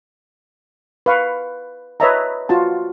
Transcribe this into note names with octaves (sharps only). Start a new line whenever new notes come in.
B4 F5 C#6
B4 C#5 D#5 E5 A5 A#5
F4 F#4 A5